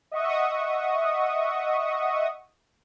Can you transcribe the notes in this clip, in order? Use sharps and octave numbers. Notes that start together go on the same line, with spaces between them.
D#5 E5 F#5 C#6 D#6